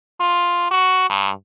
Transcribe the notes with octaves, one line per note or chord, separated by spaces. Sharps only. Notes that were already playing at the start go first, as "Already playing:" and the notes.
F4
F#4
G2